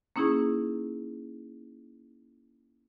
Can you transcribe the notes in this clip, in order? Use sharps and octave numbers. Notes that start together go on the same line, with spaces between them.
A#3 C#4 D#4 E4 G#4